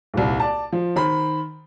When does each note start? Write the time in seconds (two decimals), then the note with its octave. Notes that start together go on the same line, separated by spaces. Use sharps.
0.14 D#1 C2
0.40 D5 A5
0.72 F3
0.96 D#3 C5 B5